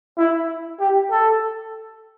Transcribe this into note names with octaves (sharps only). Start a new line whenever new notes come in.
E4
G4
A4